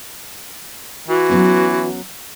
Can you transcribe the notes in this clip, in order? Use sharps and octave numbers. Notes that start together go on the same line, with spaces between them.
E3 F#4
F#3 B3 C#4